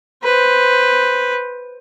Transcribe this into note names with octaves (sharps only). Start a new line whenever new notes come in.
B4 C5